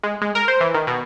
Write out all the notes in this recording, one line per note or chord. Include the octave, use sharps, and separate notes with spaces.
G#3
G#3
A#4
C5
E3
D#3
B2